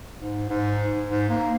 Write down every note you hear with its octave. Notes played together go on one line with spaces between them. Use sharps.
G#2
G#2
G#2
A#3